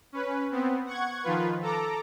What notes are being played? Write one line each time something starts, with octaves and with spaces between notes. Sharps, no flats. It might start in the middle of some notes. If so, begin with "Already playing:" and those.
C#4 B4
B3 C4
F#5 C#6 G#6
D#3 F3 F4 B4
A4 A#5 D6